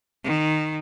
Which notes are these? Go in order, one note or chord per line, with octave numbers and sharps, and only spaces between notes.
D#3